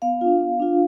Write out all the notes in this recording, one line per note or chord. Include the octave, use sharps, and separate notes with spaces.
B3 F5
D4 F4
B3
D4 F4